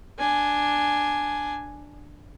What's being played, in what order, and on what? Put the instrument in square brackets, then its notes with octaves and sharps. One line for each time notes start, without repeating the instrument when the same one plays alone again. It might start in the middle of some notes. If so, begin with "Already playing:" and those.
[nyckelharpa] D4 G#5